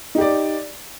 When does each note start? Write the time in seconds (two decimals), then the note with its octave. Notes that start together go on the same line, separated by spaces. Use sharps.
0.15 D#4
0.18 G4
0.21 D5